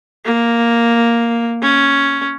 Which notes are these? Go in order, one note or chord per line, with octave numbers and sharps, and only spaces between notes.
A#3
C#4